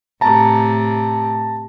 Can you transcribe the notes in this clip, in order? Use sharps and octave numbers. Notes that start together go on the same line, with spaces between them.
A2 C3 A5 A#5